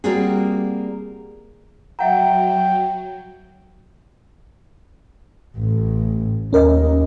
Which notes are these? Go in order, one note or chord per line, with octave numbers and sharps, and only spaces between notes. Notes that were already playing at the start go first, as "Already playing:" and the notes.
G3 A#3 C4 F4 F#4 G#4
F#3 E5 F#5 G5 A#5
A1 A2
D#2 C#4 A#4 D#5